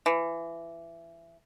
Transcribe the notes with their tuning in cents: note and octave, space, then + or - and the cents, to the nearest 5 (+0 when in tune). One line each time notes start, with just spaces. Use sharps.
E3 +20